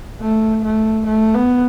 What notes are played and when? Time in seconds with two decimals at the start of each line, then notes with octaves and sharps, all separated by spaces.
0.21 A3
0.64 A3
1.06 A3
1.34 B3